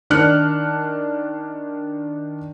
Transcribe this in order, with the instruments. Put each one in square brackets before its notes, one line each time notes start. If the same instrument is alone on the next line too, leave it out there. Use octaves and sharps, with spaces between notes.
[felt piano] D#3 D4 F6 F#6 C#7